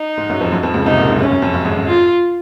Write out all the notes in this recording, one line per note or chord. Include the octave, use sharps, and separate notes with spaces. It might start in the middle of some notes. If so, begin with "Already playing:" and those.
Already playing: D#4
G#2 G#3
F#2 F#3
F2 F3
F#2 F#3
F2 F3
C#2 C#3
C2 C3 D#4
A#1 A#2
G#1 G#2
F#2 C#4
F#2
F2
F#2
G#1 G#2
F#2
F4